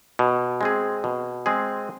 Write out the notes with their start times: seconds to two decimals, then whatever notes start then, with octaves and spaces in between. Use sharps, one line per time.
0.19 B2
0.61 G#3 C4 G#4
1.04 B2
1.46 G#3 C4 G#4